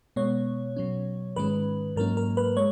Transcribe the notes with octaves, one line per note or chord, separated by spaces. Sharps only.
B2 G#3 B3 C#5
B2 F#3 C#4
G#2 D#3 G#3 C#4 B4
G#2 F#3 A#3 C#4 A#4
A#4
B4
G#3 C#5